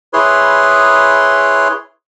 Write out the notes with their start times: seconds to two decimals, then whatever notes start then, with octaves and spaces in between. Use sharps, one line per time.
0.13 E4 G#4 B4 C#5 C6